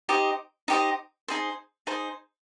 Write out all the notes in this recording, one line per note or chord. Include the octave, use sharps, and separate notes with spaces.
D#4 G4 C5 D#5
D#4 G4 C5 D#5
D#4 G#4 C5
D#4 G#4 C5